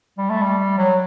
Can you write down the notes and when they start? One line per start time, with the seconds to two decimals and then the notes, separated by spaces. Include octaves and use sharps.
0.18 G3
0.30 A3
0.42 G3
0.78 F#3